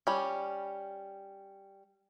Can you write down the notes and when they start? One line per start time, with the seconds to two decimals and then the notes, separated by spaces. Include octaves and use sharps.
0.07 G3 C#4